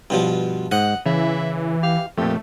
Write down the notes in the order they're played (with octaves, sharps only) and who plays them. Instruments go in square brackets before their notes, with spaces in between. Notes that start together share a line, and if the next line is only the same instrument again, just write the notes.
[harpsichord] G2 B2 F3
[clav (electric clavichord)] G#2 [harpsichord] D#5 [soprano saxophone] F#5
[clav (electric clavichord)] C#3 [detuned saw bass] E3 [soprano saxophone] E4
[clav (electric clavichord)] G4 [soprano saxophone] F5
[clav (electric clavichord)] F2 A#2 [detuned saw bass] A3 [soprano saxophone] G4